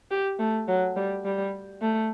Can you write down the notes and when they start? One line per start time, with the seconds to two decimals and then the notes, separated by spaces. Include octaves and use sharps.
0.11 G4
0.39 A3
0.68 F#3
0.96 G3
1.25 G3
1.82 A3